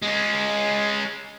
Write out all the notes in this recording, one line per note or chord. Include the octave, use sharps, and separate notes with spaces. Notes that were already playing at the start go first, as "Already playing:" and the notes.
G#3 C#4